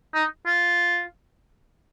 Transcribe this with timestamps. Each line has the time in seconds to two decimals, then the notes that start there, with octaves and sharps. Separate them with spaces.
0.15 D#4
0.46 F4